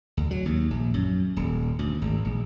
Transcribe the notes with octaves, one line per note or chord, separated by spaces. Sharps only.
D2
F#3
D#2
A#1
F#2
D#1
D2
G#1
A#1